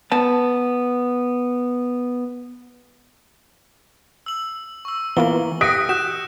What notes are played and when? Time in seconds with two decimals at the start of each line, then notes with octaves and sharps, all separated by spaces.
0.12 B3 A5
4.26 E6 F#7
4.85 C#6 E6
5.17 E3 A#3 B3 F4 A#4 G7
5.61 G4 D#6 F#6 A#6 B6 C#7 D7
5.89 F#4 F#6 G6 E7